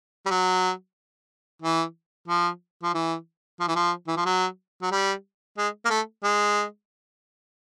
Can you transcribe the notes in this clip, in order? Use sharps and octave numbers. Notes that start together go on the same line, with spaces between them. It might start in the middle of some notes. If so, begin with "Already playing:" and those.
G3
F#3
E3
F3
F3
E3
F3
E3
F3
E3
F3
F#3
F#3
G3
G#3
A#3
A3
G#3